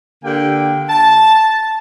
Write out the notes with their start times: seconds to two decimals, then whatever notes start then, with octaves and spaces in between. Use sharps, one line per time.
0.24 D3 A#3 G4 G5
0.89 A5